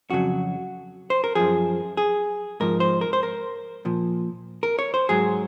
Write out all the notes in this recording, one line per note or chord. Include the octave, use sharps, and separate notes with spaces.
F2 C#3 F#3 F#4
C5
A#4
F#2 F3 G#4
G#4
G#2 F3 A#4
C5
A#4
C5
A#4
A#2 F3
A#4
C#5
C5
G#2 F#3 G#4